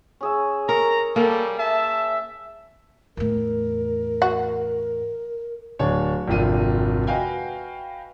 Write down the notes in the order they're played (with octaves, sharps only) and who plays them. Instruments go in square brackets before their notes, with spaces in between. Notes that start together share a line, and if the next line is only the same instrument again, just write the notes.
[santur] C#4 G#4 E5
[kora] A#4 [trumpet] A#5 [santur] C#6
[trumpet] G3 [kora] A#3 [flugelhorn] A4
[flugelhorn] E5 [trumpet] A5
[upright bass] E2 A2 [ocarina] A#4
[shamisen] F#4
[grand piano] D1 D4 C#5 A5
G#1 F2 C3 D4 F4 D#7
F#4 B4 D#5 F5 G5 G#5